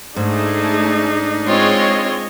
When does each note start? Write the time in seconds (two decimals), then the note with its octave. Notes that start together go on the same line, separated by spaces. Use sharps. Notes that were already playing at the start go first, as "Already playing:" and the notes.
0.16 G#2 A3 D4 D#4 G#4
1.46 G#3 C4 F4 C#5 D#5